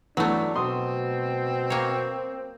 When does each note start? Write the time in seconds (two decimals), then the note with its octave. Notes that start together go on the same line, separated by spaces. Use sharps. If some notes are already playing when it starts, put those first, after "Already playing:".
0.17 E3 F#3 A3 B3 D4
0.56 B2 C4 C6 D#6
1.70 A#3 C#5